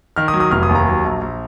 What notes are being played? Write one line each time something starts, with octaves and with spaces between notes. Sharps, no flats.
D#3 F6
D#6
F#3
D#6
F1 F6
D#6
D#2
A#5
F#3
A#1
A#1